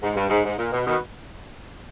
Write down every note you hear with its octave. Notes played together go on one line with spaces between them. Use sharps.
G#2
G2
G#2
G#2
A#2
B2
B2 D#3